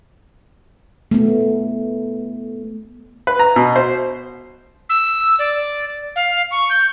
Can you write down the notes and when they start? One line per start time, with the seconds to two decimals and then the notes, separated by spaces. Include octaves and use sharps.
1.11 A3 B3
3.27 B4
3.39 A#5
3.56 B2
3.76 C5
4.89 E6
5.39 D5
6.16 F5
6.51 C#6
6.70 G6